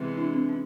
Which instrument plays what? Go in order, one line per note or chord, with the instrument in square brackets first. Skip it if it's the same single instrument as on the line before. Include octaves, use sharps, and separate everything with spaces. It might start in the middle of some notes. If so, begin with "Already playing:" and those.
Already playing: [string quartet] C3 E3 G#3 B3
[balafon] D4 E4
C4 D4
C#4